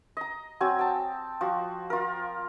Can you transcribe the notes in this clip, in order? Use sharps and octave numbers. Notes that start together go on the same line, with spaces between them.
D#5 A#5
F#3 C4 F#4 G#5
G5 A5
F3 F#4
F4 A#4